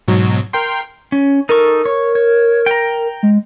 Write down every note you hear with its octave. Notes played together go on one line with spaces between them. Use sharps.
G#2 B2 F#3
A#4 G5 C6
C#4
D#4 A4 A#4 C#6
C#5
C#5
G5 A#5
G#3